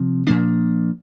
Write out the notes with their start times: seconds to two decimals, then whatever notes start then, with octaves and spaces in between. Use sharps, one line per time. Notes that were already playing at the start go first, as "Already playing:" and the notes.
Already playing: C3 F3 C4
0.27 A#2 F3 A#3 D4